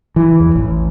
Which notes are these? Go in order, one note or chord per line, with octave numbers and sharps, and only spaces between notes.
E3
E2
A1